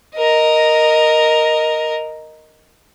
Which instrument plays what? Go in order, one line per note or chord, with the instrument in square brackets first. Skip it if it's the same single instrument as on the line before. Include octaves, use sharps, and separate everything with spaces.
[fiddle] A#4 D#5